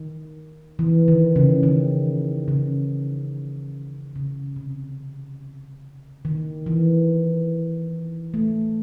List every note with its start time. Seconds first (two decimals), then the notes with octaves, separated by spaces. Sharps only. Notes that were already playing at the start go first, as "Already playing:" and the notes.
Already playing: D#3
0.79 E3
1.08 D#3
1.36 C#3
1.63 D#3
2.48 C#3
4.16 C#3
4.56 C3
6.25 D#3
6.66 E3
8.34 A3